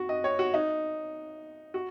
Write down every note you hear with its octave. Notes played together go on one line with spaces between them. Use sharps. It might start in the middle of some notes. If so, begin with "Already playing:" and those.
Already playing: F#4
D#5
C#5
F#4
D#4
F#4